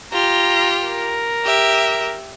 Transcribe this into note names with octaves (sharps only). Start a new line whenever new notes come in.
F4 G4 A#5
A#4
G4 E5